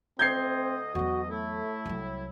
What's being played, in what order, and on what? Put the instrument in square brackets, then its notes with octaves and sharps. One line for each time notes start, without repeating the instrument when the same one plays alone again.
[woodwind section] D2 D#5 [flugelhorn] C4 [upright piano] G6 G#6 C7
[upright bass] E2 F#3 [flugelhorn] F#4
[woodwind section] A2 E4 [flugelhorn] A3
[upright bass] C2 F#3